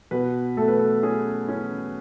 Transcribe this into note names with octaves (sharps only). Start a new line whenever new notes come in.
B2 B4
A3 A4
B4
A4
C#4 G#4
C#4